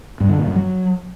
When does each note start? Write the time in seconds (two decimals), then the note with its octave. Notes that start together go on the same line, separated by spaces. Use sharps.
0.20 G2
0.29 D3
0.38 A#2
0.47 F#2
0.56 F#3